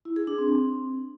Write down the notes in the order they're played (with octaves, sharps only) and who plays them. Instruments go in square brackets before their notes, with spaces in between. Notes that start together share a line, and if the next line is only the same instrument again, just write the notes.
[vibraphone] E4
G#4
D4
C4